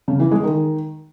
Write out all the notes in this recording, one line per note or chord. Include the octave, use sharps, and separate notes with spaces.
C#3
E3
G#3
D#3